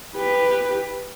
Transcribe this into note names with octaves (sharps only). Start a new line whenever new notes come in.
G4 B4